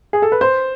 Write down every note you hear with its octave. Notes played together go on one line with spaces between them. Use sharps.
G#4
A4
B4
C5